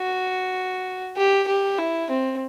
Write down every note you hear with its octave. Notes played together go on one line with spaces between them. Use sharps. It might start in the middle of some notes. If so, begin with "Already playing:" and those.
Already playing: F#4
G4
G4
E4
C4